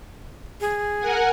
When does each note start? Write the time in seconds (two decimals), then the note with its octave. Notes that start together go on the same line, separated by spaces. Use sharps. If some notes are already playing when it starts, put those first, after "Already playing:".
0.61 G#4
0.99 A#4 F#5 G#5